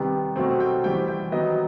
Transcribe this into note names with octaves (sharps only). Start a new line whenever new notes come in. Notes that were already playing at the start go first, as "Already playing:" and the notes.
Already playing: C3 D#3 G3 B3
B2 F#3 A3 C4
G5
E3 G3 C4 G5
G5
D#3 F#3 B3 D#5